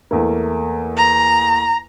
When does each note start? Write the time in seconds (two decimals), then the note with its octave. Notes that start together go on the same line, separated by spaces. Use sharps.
0.11 E2 A3 A#3
0.97 A#5